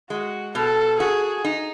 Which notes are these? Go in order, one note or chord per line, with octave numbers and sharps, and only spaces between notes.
G#3 F#4
B2 A4
F#4 G#4
D#4